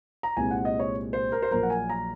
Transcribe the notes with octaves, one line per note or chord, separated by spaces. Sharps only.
A#5
C2 A#2 G#3 C4 G#5
F#5
D#5
C#5
C5
A#4
C5
A#1 A#2 F#3 A#4
F#5
G#5
A#5